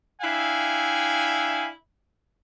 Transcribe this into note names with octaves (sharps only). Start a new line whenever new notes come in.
D4 E4 E5 F5 G5 G#5